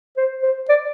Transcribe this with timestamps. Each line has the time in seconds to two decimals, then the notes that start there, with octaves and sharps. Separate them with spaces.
0.17 C5
0.43 C5
0.69 D5